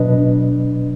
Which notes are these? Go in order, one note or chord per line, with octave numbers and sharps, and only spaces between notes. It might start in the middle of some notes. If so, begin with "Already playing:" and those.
Already playing: B2 F#3 D4 B4 D#5